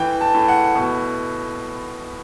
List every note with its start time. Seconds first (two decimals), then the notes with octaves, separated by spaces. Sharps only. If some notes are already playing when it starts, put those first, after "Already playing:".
Already playing: A2 E3 G5
0.21 A5
0.34 A2
0.48 F#5
0.75 B2